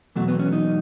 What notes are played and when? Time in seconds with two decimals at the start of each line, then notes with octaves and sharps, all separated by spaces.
0.16 E2 B2 F#3 A3
0.28 B3
0.39 C#4
0.52 D#4